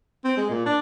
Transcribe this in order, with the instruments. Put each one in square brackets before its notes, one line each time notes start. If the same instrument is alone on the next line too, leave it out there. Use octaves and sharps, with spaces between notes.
[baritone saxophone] C4
G#3
A#2
D4